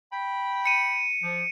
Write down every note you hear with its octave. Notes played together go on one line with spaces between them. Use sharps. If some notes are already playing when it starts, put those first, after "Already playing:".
G5 B5
C#7 D#7
F3